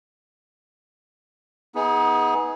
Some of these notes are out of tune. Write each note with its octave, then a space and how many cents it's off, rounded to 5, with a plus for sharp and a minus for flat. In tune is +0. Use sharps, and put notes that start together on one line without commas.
B3 +0 D#4 +40 G#4 +0